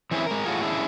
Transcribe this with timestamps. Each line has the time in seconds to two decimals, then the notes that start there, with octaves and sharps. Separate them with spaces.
0.11 E3 C4 C#4 E4 G#4
0.26 G#3 A#4
0.46 A2 F4 F#4 G#4
0.61 C#4 D4 E4 G#4